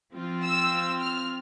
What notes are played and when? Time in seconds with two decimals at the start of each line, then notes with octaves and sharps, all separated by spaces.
0.14 F3 C4 F4
0.43 E6
1.00 F6